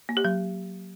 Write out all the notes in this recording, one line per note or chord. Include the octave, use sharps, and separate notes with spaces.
A#3
G4
F#3